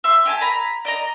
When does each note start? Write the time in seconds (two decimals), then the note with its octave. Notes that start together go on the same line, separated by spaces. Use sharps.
0.04 E5 C6
0.25 G4 G#5 A5
0.41 A#5 B5
0.85 D5 D#5 A#5